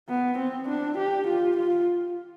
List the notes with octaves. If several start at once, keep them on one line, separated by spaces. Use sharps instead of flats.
B3
C4
D4
G4
F4
F4